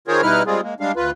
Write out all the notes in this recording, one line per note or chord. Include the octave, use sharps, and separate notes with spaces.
D#3 F4 G#4 A#4 C5 C#5
B2 G3 D#4 E4 B4 F6
G3 G#3 C4 F4 G#4
G#3 A#3
G3 G#3 D4 F5
D2 F4 B4